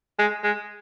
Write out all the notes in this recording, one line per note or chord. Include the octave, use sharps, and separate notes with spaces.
G#3
G#3